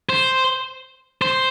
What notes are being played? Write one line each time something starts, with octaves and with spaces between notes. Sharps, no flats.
C5
C5